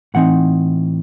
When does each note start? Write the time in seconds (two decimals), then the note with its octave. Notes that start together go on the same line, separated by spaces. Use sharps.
0.14 A2 E3 C4 D#4 F#5